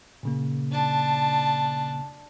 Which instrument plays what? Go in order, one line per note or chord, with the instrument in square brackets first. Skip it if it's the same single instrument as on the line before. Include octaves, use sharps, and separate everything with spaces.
[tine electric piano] A#2 C#3 A#3
[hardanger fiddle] D4 A5